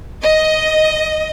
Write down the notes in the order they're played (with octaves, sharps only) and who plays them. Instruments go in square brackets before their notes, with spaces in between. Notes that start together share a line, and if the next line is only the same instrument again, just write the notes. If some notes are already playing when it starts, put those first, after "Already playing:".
[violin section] D#5